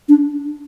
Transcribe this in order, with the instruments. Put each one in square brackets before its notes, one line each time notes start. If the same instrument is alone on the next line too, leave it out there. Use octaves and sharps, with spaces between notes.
[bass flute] D4